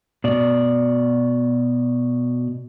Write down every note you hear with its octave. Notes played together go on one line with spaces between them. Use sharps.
B2 D5